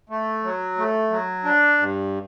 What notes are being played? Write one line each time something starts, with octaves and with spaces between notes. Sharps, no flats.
A3
F#3
A3
F#3
D4
G2